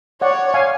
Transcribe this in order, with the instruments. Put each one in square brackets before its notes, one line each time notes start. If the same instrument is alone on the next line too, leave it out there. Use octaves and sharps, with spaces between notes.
[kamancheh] C#5 [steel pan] D5 F#5
[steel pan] F5 G#5